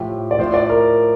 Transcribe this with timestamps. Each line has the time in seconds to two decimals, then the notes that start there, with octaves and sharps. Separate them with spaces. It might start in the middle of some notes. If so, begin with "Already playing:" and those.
Already playing: A2 F3 G4
0.31 D5
0.39 A2 F3 C5
0.54 D5
0.70 A#4